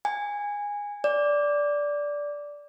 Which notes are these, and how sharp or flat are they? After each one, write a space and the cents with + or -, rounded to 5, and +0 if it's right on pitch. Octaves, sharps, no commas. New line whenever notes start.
G#5 -15
D5 -10